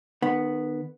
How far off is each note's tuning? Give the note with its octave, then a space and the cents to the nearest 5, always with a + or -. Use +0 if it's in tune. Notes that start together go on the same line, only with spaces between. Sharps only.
D#3 -35 B3 +0 F#5 +0